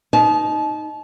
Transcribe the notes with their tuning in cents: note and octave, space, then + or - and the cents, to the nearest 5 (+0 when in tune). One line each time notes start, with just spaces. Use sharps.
D#4 +0 A5 -35